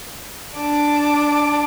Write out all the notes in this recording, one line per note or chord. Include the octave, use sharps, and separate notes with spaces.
D4 D6